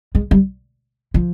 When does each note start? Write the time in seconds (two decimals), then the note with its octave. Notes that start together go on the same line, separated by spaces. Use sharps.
0.15 G#3
0.31 G3
1.14 F3